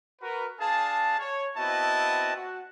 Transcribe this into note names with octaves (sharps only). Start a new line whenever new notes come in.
F#4 A#4 B4
D4 G#4 F5 A5
C#5
B3 C4 E4 F#4 D#5 A5
F#4